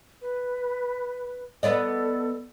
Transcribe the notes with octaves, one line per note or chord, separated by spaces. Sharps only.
B4
B3 A4 D5 D#5